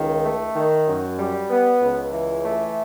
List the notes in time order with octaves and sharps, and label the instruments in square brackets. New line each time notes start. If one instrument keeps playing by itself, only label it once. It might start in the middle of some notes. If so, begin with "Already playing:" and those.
Already playing: [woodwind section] C#2 D#3
A3
D#3
F#2
G3
B3
C#2
E3
A3